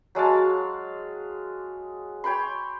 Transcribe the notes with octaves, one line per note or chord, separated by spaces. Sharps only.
F#3 G#3 F5 A5
C#5 G5 B5 C6